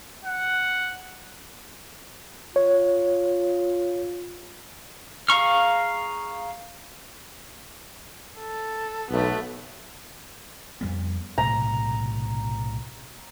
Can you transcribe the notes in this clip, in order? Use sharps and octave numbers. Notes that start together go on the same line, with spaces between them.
F#5
F4 C#5
G#4 F5 A#5 C#6 F6
A4
B1 A3 B3
F2 G3 B3
B1 A2 C3 A#5